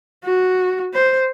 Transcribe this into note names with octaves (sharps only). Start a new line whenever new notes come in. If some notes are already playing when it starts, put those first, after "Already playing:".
F#4
C5